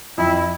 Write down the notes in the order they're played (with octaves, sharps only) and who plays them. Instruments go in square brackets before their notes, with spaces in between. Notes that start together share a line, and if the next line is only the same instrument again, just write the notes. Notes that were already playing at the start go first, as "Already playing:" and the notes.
[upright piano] F2 [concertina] E4